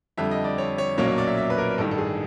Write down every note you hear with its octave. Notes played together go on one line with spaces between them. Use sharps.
F2 D3 G3 E5
D#5
D5
C#5
C#5
B1 A#2 F#3 A#3 C#4 C#5
C#5
D5
E5
E5
B4
A#4
A1 G2 D#3 A4
A4
G#4